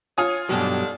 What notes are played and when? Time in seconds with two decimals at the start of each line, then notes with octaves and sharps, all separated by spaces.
0.18 F4 C#5 G#5 D#6
0.49 G2 B2 D3 D#3 F#3 D4 G4